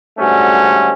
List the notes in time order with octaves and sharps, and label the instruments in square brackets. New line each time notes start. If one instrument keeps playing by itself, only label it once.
[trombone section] D2 G#2 G3 A3 C#4 F#4